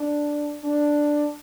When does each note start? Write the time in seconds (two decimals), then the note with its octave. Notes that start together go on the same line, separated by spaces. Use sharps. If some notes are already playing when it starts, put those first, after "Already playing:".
Already playing: D4
0.64 D4